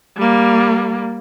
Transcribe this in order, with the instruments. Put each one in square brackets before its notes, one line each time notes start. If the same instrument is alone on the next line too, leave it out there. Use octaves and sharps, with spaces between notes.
[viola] G3 A#3